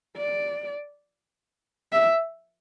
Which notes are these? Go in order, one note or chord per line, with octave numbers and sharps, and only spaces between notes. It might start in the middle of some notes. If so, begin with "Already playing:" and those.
D5
E5